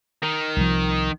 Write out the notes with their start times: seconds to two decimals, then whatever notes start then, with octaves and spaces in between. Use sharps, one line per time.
0.23 D#3
0.57 C2 F3